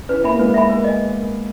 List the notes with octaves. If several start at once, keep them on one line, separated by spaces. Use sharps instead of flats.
C#4 E4 B4
A#3 C#4 E5 G#5 B5
A#3
G#3 B3 B4
E5 G#5 B5
A#4
D#5 G#5